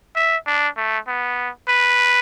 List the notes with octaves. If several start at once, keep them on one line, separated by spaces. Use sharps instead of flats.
E5
D4
A3
B3
B4